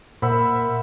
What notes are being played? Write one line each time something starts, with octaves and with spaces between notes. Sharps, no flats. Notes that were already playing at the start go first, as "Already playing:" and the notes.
A#2 A#4 C5 E5 F#5 B5